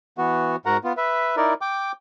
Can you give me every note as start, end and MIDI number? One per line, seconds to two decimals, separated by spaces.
0.18 0.56 52
0.18 0.56 59
0.18 0.56 66
0.66 0.77 44
0.66 0.77 66
0.66 0.77 70
0.66 0.77 78
0.66 0.77 82
0.84 0.93 59
0.84 0.93 65
0.97 1.36 71
0.97 1.36 76
1.37 1.54 63
1.37 1.54 64
1.37 1.54 70
1.37 1.54 74
1.61 1.92 79
1.61 1.92 86